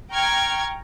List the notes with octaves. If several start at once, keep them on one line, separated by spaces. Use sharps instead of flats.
G5 A#5 C#6 F6 G#6